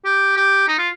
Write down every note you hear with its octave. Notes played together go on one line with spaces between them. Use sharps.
G4
G4
D#4
F4